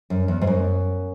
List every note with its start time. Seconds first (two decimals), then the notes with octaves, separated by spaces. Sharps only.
0.10 F#2
0.28 E2
0.42 G#2
0.47 F#2